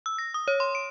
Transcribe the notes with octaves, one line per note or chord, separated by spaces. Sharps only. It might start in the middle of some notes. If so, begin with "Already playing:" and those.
E6
A#6
D#6
C#5
C6
D7